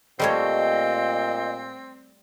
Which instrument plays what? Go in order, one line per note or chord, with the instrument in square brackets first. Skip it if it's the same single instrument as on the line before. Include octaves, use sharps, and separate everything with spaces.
[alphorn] A#2 [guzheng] G3 A3 C#5 [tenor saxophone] C4 [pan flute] D#5